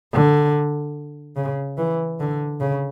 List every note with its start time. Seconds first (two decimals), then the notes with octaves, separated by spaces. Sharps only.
0.13 D3
1.36 C#3
1.78 E3
2.20 D3
2.61 C#3